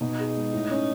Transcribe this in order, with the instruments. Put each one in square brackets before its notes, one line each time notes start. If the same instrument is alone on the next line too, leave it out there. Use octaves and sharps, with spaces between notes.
[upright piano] B2 [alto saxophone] D#4
[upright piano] G#4
G#3
A2
C#4